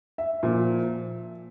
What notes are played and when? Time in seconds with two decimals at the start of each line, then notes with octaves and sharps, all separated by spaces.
0.18 E5
0.43 A#2 F3